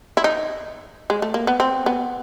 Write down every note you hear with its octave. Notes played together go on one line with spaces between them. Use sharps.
E4
D#4
G#3
A3
A#3
B3
C4
B3